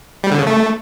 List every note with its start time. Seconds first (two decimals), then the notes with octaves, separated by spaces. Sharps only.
0.24 G3
0.31 D3
0.39 C#3
0.47 A3